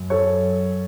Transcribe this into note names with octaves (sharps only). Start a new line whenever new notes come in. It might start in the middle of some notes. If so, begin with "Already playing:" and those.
Already playing: F#2
A4 C#5